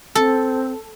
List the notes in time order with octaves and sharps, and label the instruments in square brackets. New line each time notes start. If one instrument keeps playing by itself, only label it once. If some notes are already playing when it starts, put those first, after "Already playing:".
[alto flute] C4 [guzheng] A4